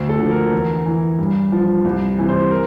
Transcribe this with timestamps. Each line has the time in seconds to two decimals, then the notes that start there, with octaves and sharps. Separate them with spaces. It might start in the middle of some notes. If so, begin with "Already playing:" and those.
Already playing: D2
0.09 A4
0.19 D3 F3
0.31 A#4
0.52 E2
0.86 E3
1.19 G2
1.52 F3
1.85 C2
2.18 C3 E3
2.29 C5
2.51 A#4